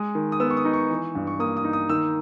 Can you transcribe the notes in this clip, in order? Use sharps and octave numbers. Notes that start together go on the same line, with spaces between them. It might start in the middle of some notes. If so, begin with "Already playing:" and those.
Already playing: G#3 D#6
D#3
D#6
B3 E6
C#6
D#6
D#4
C#6
E3
G2
C#6
A#3 D#6
D#6
D#4
D#6
D#3 E6